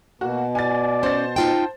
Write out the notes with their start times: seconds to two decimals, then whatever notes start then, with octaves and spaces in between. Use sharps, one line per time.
0.21 B2 A#3 F#4
0.55 D5 G#5 A6
1.03 C#4 C5 A6
1.36 D#4 F4 G5 A5